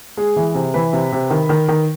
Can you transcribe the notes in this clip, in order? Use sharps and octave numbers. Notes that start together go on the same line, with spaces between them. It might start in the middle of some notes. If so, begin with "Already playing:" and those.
G#3 G#4
E3
C3
E3 B4
C3
C3
D#3
D#3
D#3